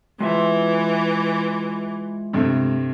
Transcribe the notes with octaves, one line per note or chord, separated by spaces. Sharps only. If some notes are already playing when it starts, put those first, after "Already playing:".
E3 G#3 F4 E5
G2 C3 A3